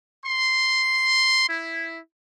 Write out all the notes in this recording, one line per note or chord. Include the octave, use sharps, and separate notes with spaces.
C6
E4